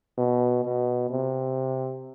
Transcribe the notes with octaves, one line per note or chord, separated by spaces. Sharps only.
B2
B2
C3